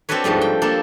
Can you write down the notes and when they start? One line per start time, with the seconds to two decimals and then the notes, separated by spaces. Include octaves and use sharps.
0.09 C4 D4 F#4 A4 B4 C#5
0.24 G#2 F3 G3 A3
0.41 G5
0.62 A#3 D4 A4